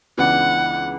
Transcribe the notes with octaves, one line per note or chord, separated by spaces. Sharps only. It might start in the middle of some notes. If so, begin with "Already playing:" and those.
C#2 C#3 E3 B3 D4 F#5